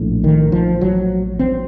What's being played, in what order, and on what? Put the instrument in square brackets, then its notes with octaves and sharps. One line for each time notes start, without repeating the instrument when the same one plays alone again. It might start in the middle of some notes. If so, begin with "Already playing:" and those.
Already playing: [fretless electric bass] A#1 A2
D#3
F3
F#3
C4